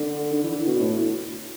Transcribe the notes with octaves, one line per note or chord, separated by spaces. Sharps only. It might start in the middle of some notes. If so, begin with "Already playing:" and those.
Already playing: D3
D3
E3
D3
B2
A2